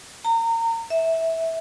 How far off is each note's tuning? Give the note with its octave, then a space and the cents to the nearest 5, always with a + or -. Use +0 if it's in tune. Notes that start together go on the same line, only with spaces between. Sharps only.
A#5 -30
E5 -15